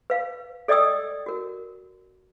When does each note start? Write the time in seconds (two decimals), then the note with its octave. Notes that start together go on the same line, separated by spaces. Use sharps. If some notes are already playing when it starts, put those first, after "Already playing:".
0.10 B4 F5
0.68 A4 D5 D#5 G5 D#6 E6
1.26 F#4 A#4